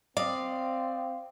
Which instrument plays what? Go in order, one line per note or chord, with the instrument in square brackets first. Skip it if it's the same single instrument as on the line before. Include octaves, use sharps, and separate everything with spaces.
[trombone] C4 [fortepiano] D5 D#5 [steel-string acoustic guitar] F5